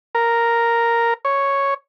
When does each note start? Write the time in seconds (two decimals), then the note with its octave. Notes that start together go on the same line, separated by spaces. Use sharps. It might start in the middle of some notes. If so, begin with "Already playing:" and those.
0.15 A#4
1.25 C#5